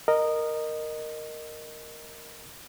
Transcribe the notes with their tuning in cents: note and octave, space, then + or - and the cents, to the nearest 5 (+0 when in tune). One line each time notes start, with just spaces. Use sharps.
A#4 +0 D#5 -15